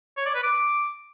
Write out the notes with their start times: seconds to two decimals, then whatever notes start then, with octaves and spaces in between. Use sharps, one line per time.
0.17 C#5
0.26 D5
0.35 B4
0.44 D6